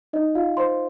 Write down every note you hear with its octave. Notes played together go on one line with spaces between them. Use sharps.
D#4 D#5
F4 F5
C5 C6